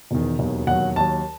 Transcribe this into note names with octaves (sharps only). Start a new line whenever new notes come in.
E1 E2 D#3
E1 D#2 D#3 F#3
E1 D#2 D#3 F#3 F#5
D#2 D#3 F#3 A5